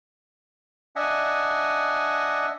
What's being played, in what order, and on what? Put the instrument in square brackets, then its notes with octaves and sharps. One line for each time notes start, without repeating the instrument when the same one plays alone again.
[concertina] D4 D#5 E5 F#5 G#5